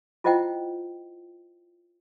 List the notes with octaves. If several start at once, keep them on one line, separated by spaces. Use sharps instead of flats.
E4 F4 C5 D#5 F#5 G5